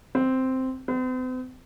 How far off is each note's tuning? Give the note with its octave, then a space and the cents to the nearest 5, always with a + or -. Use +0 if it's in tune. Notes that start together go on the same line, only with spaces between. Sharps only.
C4 -5
C4 -45